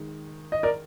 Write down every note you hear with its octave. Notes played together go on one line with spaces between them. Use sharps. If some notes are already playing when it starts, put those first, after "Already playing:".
Already playing: D#3 G#3
D#5
A#4 D5